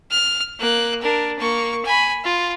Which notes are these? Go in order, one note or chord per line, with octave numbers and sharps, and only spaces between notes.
F6
A#3 F#6
D4 A#4
A#3 C#6
G#5 B5
F4